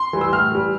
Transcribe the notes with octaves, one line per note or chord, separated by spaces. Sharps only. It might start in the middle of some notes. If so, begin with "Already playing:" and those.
Already playing: C6
E3 G3
E6
A2 F6
E3 G3